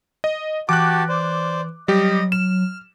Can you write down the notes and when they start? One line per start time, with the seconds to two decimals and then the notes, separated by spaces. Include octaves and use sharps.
0.24 D#5
0.69 E3 F#4 G4 A5 D6 F#6
1.09 C5 D5
1.88 F#3 G3 G4 D#5
2.32 F6 E7